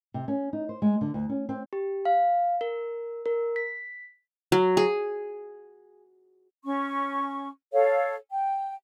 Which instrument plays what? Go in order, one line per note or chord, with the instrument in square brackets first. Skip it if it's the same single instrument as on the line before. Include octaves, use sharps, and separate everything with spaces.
[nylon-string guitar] C3
C#4
D#4
C5
G#3
D3
D2
C#4
C4
[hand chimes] G4
F5
A#4
A#4
B6
[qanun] F#3
G#4
[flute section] C#4 C#6
A4 C#5 F5
G5